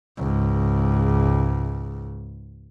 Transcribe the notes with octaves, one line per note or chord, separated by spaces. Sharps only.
C#2 G#2